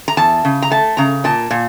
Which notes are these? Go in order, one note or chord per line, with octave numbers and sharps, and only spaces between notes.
A#5
E2 A5
C#3
A#5
A3 A5
C#3 A#5
A#2 A5
A#2